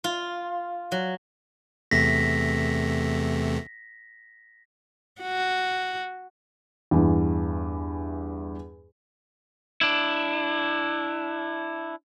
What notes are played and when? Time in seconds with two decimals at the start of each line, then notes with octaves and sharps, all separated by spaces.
0.04 F4
0.92 F#3
1.91 E2 C3 A3 A#6 B6
5.22 F#4
6.91 E2 G2 E3
9.81 D4 E4